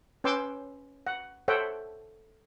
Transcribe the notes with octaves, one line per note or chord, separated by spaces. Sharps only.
C#4 B4 G5 C6 D6 E6
F#5
A4 C5 C#5 E5 F#5 G5